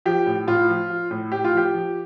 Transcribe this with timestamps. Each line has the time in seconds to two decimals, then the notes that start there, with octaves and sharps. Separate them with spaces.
0.06 F3 G4
0.26 A2
0.47 A2 F4
0.69 F3
0.90 F3
1.11 A2
1.32 A2 G4
1.44 F4
1.53 F3 G4
1.74 F3